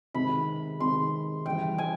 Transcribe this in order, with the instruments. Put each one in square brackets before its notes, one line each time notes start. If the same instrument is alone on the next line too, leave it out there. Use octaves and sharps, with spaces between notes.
[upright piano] C3 D#3 G#3 [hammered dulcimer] B5
[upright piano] C3 D#3 G#3 [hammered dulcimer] C6
[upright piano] C#3 E3 G3 [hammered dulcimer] G5
[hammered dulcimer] G#5